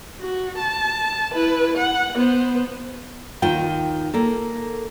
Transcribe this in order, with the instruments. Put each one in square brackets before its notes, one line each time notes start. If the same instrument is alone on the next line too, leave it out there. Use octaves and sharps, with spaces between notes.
[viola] F#4
A5
E4 B4
F#5
B3 C5
[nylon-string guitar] D#2 D#3 F4 G5
A#3 A4